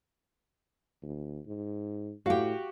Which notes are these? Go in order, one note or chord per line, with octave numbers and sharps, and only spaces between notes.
D2
G#2
A2 F#4 G4 F5 G5